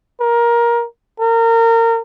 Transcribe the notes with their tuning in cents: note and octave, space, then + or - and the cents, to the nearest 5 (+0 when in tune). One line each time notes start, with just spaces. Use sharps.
A#4 +15
A#4 -25